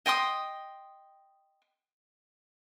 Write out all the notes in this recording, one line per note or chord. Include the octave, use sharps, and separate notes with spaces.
D#5 G5 C6 D#6